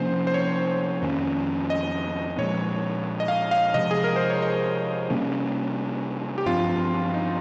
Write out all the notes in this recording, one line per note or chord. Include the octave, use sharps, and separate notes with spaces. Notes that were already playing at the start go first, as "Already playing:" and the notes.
Already playing: C3 F3 A#3 C#4 C5
C5
C#5
F2 D#3 A#3 C#4
D#5
A#2 F3 G#3 C#5
D#5
F5
F5
C3 F3 G#3 D#5
G#4
A#4
C5
C#5
D#5
C3 G3 A#3 C#4
G4
G2 F3 C4 F4
D#4